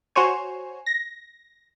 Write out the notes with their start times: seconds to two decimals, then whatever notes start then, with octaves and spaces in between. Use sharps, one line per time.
0.15 F#4 C5 C#5 G#5
0.86 A#6